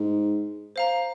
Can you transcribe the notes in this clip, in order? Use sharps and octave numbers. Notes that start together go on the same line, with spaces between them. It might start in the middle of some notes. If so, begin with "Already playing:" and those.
Already playing: G#2
C5 F5 A#5